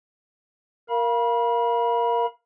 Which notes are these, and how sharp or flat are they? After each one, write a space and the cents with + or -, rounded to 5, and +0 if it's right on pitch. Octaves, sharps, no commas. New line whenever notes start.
A#4 +0 F5 -10 B5 -35